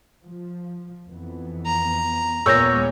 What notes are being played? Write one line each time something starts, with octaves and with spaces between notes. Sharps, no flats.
F3
F2 E3 B3
A#5
D#2 A#2 G#3 B3 C#5 E6 G6 A#6